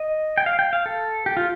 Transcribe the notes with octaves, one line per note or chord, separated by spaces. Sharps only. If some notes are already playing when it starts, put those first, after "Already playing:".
Already playing: D#5
G5
F5
G5
F5
A4
G4
F4